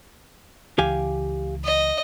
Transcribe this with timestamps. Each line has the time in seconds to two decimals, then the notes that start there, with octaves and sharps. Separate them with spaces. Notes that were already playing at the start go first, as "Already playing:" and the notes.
0.78 C#2 E3 G4 F5 G#5
1.64 D#5